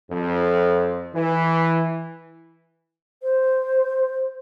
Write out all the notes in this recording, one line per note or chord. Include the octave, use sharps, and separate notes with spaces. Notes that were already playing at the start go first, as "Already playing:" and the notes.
F2
E3
C5